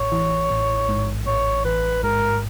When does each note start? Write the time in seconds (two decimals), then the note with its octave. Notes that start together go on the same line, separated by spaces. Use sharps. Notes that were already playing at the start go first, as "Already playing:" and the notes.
Already playing: A1 C#5
0.12 E3
0.50 A1
0.89 G#2
1.27 A1 C#5
1.65 A1 B4
2.03 G#2 A#4